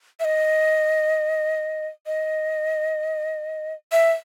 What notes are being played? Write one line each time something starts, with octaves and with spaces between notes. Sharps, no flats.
E5
D#5
D#5
E5